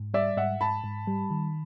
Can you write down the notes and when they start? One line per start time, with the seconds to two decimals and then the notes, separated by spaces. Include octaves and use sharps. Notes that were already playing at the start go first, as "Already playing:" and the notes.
Already playing: G#2
0.14 G3 D5 E5
0.37 G#2 E5 F#5
0.61 G#2 A5 B5
0.84 G#2
1.07 G3
1.30 D#3